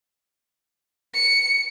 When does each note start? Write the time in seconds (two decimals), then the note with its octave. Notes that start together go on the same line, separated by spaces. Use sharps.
1.15 C#7